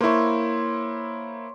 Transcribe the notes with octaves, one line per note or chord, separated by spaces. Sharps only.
A#3 E4 C5 C#5